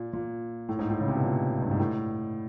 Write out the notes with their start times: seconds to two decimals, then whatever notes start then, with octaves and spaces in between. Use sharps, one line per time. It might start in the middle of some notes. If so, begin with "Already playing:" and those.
Already playing: A#2
0.13 A#2
0.69 A2
0.79 G#2
0.90 A2
1.00 C#3
1.08 C3
1.15 B2
1.24 A#2
1.62 G2
1.71 G#2
1.79 A2